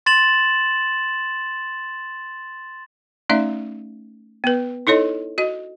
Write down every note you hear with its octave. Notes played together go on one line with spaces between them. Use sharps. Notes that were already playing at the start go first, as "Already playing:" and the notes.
C6 A6 E7 F#7
A3 C#4 D#4 D5 E5
B3 B4
D#4 E4 A4 C#5 D#5
F#4 D#5